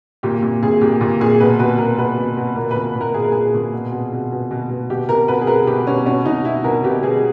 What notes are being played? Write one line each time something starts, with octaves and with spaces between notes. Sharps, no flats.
A#2 G4
A#2
A#2 G#4
A#2 G4
A#2
A#2 G#4
B2 B4
B2 B4
B2 A#4
B2 B4
B2
B2
A#2 A#4
B4
A#2
B4
A#2
A#4
A#2 G#4
A#4
A#2 G#4
A#2
B2
B2
B2
B2
B2
B2
B2 G4
B2 A#4
B2 B4
G#4
B2 A#4
B2 G4
B2 C#4
B2 C#4
B2 D#4
B2 E4
B2 A#4
B2 G4
B2 G#4